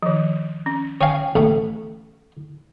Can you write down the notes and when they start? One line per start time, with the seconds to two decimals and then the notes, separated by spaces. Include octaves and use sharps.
0.03 D#3 F3
0.66 C#4
1.01 C#5 F5 G5 G#5
1.35 A1 A3